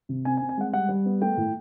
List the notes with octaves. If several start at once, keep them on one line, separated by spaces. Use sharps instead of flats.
C3
C4 G#5
G#5
C4
G#5
G#3 F#5
G3 F#5
G3
B3
A3 G5
A2